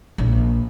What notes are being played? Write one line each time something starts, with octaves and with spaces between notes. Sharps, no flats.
A#1